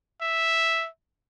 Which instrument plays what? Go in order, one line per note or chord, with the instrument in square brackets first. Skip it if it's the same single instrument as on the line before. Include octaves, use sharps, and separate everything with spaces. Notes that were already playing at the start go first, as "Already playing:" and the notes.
[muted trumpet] E5